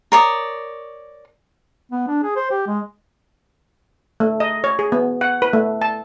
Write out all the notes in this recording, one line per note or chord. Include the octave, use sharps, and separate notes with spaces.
A#4 C#5 D5 D#6
B3
D4
G#4
C5
G4
G#3
A3
D#5
C#5
G#4
B3
F#5
B4
A3
A5